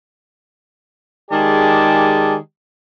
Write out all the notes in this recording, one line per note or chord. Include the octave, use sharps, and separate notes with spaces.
D#3 G#3 G4 G#4 D5 A5